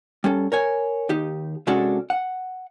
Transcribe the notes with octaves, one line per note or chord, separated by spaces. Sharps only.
G3 C#4 A4
A#4 C#5 G#5
D#2 D#4 G4
C3 G#3 C#4 D4 F#4 A4
F#5